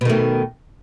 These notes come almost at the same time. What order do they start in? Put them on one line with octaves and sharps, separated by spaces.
B2 D#3 A3